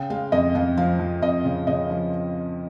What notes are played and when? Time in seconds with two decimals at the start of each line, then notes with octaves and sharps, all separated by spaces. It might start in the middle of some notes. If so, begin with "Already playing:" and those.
Already playing: C#3 G5
0.10 G#3 F5
0.32 F2 D#5
0.55 F2 F5
0.77 F3 F5
1.00 F3
1.22 F2 D#5
1.45 C#3
1.67 C#3 D#5
1.90 F3